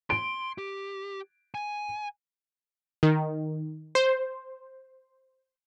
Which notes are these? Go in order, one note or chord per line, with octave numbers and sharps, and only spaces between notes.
C6 D7
G4
G#5
D#3
C5